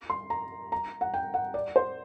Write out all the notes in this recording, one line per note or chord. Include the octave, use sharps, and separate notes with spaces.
C6
A#5
A#5
F#5
G5
F#5
D5
C5